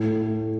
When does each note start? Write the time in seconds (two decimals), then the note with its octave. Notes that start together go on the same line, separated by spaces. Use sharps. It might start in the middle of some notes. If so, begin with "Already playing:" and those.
Already playing: A2
0.21 A3